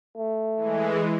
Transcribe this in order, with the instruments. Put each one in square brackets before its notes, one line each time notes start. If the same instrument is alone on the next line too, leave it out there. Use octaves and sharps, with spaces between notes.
[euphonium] A3
[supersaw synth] E3 G#3